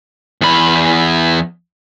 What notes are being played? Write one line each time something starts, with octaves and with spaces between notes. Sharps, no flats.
E2 B5